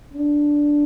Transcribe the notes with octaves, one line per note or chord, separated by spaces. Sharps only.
D4